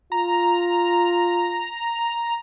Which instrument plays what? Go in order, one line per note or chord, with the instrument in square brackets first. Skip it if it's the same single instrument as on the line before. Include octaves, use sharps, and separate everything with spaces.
[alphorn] F4 [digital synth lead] A#5